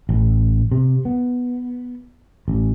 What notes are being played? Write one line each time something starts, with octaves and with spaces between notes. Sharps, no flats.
A1
C3
B3
A1